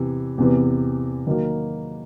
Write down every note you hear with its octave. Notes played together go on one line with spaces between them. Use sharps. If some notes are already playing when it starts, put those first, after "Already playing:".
Already playing: E2 C3 E3
E2 C3 E3
D#3 F#3 A#3